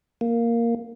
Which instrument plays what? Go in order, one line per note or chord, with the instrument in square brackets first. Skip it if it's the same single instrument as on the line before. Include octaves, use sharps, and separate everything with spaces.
[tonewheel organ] A#3